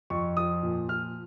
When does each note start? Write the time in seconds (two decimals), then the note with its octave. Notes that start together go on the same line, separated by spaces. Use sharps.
0.10 F2 C#6
0.37 F3 D#6
0.63 A#2
0.89 F3 F6